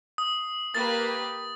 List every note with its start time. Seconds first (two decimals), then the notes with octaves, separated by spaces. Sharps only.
0.18 D#6
0.75 A#3 G4 B4 A6